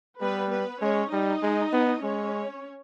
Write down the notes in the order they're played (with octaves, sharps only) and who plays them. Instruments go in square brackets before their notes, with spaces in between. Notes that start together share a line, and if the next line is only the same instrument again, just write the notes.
[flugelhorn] G3 [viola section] B3 B4
[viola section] B3 B4
[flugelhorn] G#3 [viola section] C#4 C#5
[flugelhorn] G3 [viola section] D#4 D#5
[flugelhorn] G#3
B3
[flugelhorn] G#3 [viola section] C#4 C#5